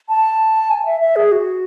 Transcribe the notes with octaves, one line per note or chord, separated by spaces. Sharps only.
A5
G#5
E5
E5
G#4
F#4